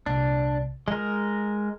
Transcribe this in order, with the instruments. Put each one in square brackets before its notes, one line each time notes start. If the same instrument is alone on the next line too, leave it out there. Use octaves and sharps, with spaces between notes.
[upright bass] C2 A#2 [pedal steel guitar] D4
[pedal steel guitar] G#3 A#4 [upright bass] F4